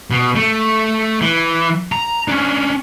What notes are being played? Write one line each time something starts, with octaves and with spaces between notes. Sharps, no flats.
B2
A3
E3
A#5
C#4 D4